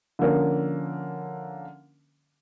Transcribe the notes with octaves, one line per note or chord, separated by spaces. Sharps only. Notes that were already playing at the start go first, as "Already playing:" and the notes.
D3 F3 A#3 C#4